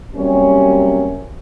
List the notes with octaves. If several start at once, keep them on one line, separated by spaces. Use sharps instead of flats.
C3 F#3 G3 A#3 C#4